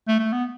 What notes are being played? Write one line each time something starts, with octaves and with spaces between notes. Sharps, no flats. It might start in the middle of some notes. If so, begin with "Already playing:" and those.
A3
A3
B3